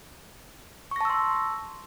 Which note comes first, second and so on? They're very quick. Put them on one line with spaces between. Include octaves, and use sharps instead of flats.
C#6 A#6 A5 E6 C6